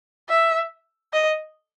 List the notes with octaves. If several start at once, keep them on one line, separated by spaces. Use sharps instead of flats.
E5
D#5